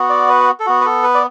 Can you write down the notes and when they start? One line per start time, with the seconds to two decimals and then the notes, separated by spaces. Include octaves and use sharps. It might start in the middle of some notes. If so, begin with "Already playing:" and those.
Already playing: B3 F#4
0.10 D5
0.29 B4
0.60 A4
0.66 B3 F#4
0.81 B4
0.85 A4
1.04 B4
1.15 D5